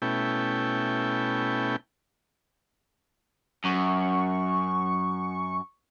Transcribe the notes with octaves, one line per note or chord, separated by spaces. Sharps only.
B2 A3 C#4 E4 G5
F#2 C#6